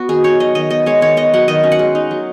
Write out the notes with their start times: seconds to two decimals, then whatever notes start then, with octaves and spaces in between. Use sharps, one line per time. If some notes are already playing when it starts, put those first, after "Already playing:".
Already playing: B3 F#4
0.09 D#3 G#4
0.24 D#4 C#5
0.40 F#3 D#5
0.55 D#3 D#5
0.70 B3 D#5
0.86 G#3 C#5
1.01 D#3 C#5
1.17 B3 D#5
1.33 F#3 F#5
1.48 D#3 D#5
1.64 C#4
1.72 F#5
1.79 G#3
1.95 D#4
2.11 F#3